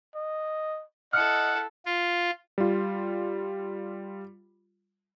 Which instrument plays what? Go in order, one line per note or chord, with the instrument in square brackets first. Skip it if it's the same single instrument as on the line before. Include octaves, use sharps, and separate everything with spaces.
[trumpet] D#5
[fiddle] E4 A4 [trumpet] D#5 [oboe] F#5 [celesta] F6 C#7
[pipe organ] F4
[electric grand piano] G3 F4